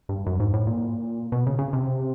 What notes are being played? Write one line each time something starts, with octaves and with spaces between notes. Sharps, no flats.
G2
F#2
G#2
A2
A#2
B2
C#3
C#3
C3